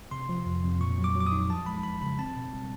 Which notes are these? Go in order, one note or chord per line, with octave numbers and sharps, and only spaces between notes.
C3 C6
F3
F2
F2
A#2 C#6
F#3
D6
F#3
D6
D#6
D#4
F3 A5
G#3 B5
F3 B5
C#3 B5
C4 A5
B2
G3